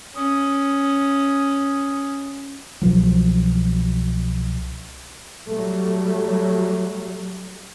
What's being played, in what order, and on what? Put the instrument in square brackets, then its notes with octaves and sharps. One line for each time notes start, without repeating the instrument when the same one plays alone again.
[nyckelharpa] C#4 D#6
[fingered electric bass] C2 B2 F3 F#3
[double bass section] F#3 G3 A3